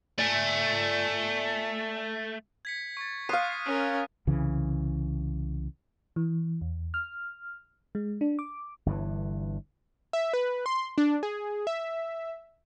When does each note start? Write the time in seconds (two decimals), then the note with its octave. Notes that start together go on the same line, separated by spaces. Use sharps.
0.19 A3 D5 G#5
2.65 G#6 B6 C#7
2.97 C#6 A6
3.29 F5 C6 D#6 F#6 D#7
3.65 C#4 A#4
4.27 C2 C#3 E3
6.16 E3
6.61 E2
6.94 F6
7.95 G#3
8.21 D4
8.39 D6
8.86 G1 G2 C3 E3
10.13 E5
10.33 B4
10.66 C6
10.98 D4
11.23 G#4
11.67 E5